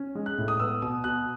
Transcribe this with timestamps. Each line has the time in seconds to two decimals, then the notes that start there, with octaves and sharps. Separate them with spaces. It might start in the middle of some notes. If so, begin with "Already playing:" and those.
Already playing: C#4
0.15 G#3
0.26 F#6
0.38 A2
0.48 D#6
0.60 B3 E6
0.82 B2 D#6
1.04 B2 F#6